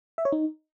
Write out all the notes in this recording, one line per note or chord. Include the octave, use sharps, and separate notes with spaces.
E5
C#5
D#4